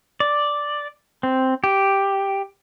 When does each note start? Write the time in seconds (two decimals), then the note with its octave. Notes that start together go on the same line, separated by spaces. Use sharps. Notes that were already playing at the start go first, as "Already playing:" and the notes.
0.20 D5
1.23 C4
1.64 G4